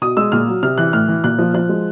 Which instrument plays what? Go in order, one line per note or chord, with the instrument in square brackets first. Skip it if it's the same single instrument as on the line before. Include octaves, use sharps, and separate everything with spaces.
[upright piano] B2 D#6
G#3 E6
A#2 F6
F#3
C3 F6
E3 F#6
A2 F6
E3
A#2 F#6
F3
F3 F#6
G#3